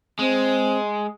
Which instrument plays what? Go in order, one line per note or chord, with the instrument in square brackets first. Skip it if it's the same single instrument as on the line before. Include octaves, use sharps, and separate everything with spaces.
[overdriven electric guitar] G#3 [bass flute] C4